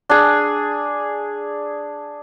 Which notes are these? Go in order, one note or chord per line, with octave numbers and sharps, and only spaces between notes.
D4 G#4